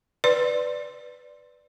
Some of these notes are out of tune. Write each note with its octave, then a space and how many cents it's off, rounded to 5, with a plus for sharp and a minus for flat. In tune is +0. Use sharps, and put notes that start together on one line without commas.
B4 +0 D5 +0 C6 +0